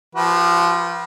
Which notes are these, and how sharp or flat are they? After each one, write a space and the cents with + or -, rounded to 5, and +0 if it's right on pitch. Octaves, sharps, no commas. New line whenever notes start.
F3 -15 F#4 +45 B4 -30